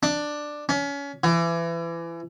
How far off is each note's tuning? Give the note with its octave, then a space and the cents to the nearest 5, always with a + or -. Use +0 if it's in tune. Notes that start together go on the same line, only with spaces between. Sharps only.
D4 +10
C#4 +30
E3 +30